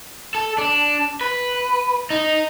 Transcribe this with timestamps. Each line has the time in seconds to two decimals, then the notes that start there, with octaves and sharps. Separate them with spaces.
0.35 A4
0.58 D4
1.21 B4
2.10 D#4